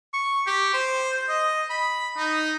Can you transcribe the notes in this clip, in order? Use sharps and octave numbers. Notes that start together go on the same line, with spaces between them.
C#6
G4
C5
D#5
B5
D#4